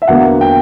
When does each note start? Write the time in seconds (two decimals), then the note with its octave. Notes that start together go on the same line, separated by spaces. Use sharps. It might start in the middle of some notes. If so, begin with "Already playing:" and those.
0.02 E5
0.08 E2 D3 F#3 A#3 F#5
0.41 G5